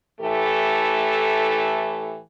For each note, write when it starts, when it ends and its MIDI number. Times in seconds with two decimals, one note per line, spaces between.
0.20 2.19 45
0.20 2.19 52
0.20 2.19 57
0.20 2.19 67
0.20 2.19 69